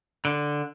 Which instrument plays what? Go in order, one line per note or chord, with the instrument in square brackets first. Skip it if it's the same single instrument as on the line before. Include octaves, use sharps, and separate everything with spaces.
[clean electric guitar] D3